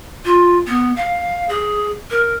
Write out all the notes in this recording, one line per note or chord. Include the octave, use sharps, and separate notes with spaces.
F4
B3
F5
G#4
A#4